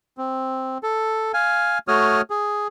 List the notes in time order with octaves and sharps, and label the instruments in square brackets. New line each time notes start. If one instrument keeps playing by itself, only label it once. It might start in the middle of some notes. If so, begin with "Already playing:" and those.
[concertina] C4
A4
F5 G#5
A3 F#4 C#5 D#6 F6
G#4